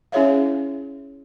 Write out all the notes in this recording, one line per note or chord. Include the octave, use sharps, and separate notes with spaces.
C#4 E4 G#4 C#5 E5 F5